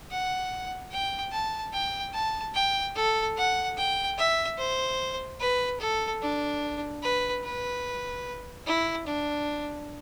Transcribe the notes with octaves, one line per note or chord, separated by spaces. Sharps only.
F#5
G5
A5
G5
A5
G5
A4
F#5
G5
E5
C5
B4
A4
D4
B4
B4
E4
D4